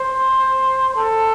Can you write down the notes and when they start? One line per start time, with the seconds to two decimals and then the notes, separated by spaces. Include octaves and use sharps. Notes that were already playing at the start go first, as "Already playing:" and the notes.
Already playing: C5
0.96 A4